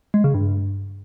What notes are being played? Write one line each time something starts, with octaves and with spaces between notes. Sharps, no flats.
G#3
C#3
G2